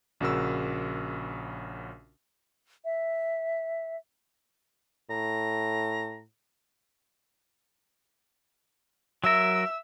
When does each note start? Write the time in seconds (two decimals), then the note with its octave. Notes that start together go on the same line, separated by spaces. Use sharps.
0.20 A#1 C#3 F#4 A#4 E6
2.85 E5
5.10 A2 A#5
9.24 F#3 A#4 E5 E6